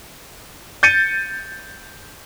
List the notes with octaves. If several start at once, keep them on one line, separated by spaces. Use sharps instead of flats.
G6 A6 C#7 D#7